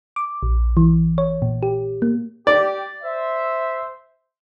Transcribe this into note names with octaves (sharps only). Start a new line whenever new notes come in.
D6
A#1
E3
C#5
A#2
G4
A#3
G4 D5
C5 E5